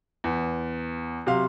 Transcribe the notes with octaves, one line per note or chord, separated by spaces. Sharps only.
E2
C3 F#3 F5 C6